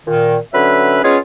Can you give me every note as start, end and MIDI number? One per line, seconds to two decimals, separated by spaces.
0.06 0.37 46
0.06 0.37 51
0.54 1.00 50
0.54 1.00 54
0.54 1.00 61
0.54 1.00 71
0.54 1.00 76
0.54 1.00 83
1.04 1.18 56
1.04 1.18 59
1.04 1.18 61
1.04 1.18 65
1.04 1.18 68
1.04 1.18 73